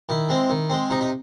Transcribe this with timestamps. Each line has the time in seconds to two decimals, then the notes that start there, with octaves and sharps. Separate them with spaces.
0.09 D#3 E4
0.29 G#3 C4
0.49 D#3
0.70 G#3 C4
0.90 C3 D#4
1.01 D#4